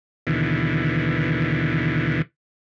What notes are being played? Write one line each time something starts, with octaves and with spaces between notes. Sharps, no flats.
D#2 B2 D3 E3